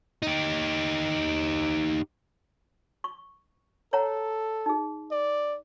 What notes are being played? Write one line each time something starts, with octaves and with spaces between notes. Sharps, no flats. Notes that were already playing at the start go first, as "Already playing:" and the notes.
D#4 G4
C#6
A4 C#5 F#5 A#5
D#4 G#4
D5